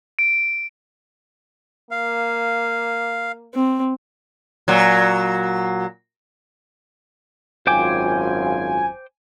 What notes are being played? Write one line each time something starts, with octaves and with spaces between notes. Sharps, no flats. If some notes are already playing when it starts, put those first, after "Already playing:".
D7
A#3 F5
C4
A#2 F#3
G#1 F#2 F4 C5 G5 G#5 D6